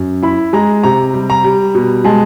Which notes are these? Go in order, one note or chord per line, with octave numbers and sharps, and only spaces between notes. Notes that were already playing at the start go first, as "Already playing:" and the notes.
Already playing: F#2
E4 B5
G#3 A#5
C3 A#5
G3
A#5
G3
B2
G#3 A5